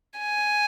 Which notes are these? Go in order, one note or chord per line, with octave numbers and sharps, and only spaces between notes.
G#5